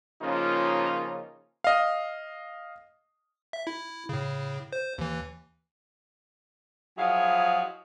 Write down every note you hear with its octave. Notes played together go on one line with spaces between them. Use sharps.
C#3 F3 A#3 C#4 D#4 F4
D#5 F5
E5
E4
A2 C#3
C5
D#2 E3
F3 F#3 E4 G#4 D#5 F5